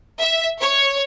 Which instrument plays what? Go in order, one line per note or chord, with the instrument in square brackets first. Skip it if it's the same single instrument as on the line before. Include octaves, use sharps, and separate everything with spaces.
[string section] E5
C#5